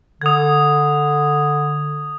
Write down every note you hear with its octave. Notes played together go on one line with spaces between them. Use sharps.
D3 D#6 G#6